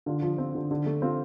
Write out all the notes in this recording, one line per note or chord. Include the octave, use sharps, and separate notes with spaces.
D3 F4
F3 F4
C4 F4
D3
D3
A3
C4 F4